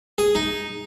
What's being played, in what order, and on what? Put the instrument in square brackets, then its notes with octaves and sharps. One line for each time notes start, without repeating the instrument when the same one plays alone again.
[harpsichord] G#4
D#4